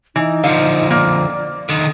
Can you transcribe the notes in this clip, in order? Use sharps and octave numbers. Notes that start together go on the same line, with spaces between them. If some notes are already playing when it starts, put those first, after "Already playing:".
E3 D#4
D3 F3 F5
A#3 D5
D3 D#3